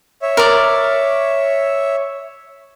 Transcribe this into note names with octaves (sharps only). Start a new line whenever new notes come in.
C#5 E5
A#4 D5